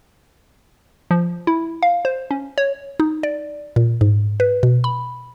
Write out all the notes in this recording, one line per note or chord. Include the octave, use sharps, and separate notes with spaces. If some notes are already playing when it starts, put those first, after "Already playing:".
F3
E4
F5
C5
C#4
C#5
D#4
D5
A#2
G#2
B4
B2
B5